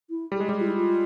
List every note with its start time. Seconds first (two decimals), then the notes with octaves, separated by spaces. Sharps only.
0.10 E4
0.32 G3
0.35 G#4
0.40 G#3
0.46 G3 G4
0.60 F4
0.67 E4
0.75 F4